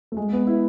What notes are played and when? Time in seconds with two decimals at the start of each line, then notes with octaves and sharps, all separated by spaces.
0.12 A3
0.17 G#3
0.33 B3
0.47 E4